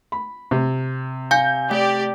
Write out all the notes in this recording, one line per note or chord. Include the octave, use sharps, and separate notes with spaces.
B5
C3
F5 G#5 G6
A3 G4 D5